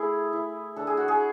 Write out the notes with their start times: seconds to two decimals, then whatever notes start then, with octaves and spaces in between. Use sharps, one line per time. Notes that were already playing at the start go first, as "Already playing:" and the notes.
Already playing: A3 E4 G#4
0.33 E4
0.76 D4 A4
0.87 G#4
0.97 F#4
1.08 G#4